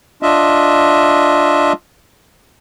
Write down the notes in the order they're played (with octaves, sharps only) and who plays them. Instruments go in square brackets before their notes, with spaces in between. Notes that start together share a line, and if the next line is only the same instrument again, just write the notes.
[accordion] D4 F4 D#5 E5